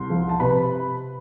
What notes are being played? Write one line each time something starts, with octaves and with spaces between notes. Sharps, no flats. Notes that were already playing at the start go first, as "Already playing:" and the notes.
Already playing: C2 C6
F3
A5
C3 B4 B5